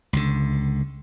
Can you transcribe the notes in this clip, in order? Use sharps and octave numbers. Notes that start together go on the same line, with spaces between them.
C#2 D3